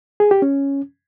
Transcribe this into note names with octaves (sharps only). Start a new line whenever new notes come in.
G#4
G4
C#4